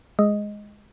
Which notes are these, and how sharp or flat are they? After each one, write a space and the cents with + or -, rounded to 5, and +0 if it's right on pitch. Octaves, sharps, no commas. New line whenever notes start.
G#3 +0 D#5 +0